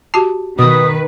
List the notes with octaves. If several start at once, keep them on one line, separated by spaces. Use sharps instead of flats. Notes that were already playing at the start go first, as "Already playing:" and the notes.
F#4 G4 A5 C7
B2 D#3 B4 D#6